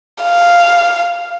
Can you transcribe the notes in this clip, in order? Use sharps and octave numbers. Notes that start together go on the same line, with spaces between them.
F5